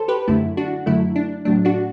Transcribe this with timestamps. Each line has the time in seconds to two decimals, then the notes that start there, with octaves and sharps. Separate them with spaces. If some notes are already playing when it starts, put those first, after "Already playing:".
Already playing: E2 A4 C5
0.08 G4 B4
0.28 F#2 D3 A3 E4
0.57 D4 F#4
0.86 F#2 D3 F#3 A3 E4
1.16 D4
1.45 A2 F#3 A3 D4
1.65 D4 F#4